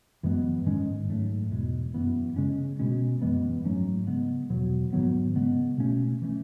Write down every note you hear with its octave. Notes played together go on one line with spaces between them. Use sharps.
F#2 E3 G#3 B3
G#2 D#3 G#3 C#4
G#2 F#3 A3
E2 B2 G#3
F#2 E3 B3
C#3 G#3 C#4
B2 G#3 C#4
F#2 E3 G#3 B3
G#2 F#3 A3 C#4
C#3 G#3 B3
E2 B2 F#3
G#2 D#3 F#3 B3
C#3 G#3 B3
B2 A3 C#4
E3 A3 C#4